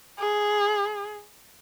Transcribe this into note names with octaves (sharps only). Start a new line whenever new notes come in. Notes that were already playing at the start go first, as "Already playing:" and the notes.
G#4